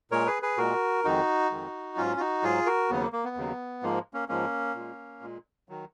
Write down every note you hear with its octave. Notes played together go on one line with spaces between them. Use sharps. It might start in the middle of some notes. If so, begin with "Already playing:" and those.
A#2 G#3 A#4 C#5
G#4 B4
G#4 B4
A#2 G#3 F#4 A#4
F2 D#3 G#3 D#4 F#4
F2 D#3 G#3
G#2 F#3 C#4 F4
F4
D#4 F#4
G#2 F#3 F4 G#4
F#4 A#4
D#2 C#3 F#3 B3
A#3
A#3
B3
D#2 C#3 F#3
G#2 F3 G#3 A#3
A#3 C#4
G#2 F3 G#3 A#3 C#4
A#2 G#3
A#2 G#3
D#3 F#3